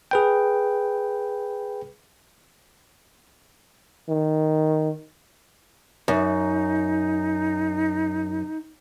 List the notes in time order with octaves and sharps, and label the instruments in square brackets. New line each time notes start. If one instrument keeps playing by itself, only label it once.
[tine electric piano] G#4 B4 G5
[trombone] D#3
[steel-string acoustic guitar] F#2 [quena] D#4